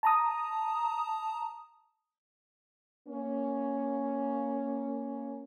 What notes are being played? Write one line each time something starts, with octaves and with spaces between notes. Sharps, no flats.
A5 A#5 D#6
A#3 C#4